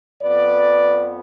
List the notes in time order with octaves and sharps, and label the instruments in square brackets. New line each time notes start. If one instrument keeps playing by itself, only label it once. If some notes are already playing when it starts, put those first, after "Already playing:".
[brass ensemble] F2 F3 B3 B4 D5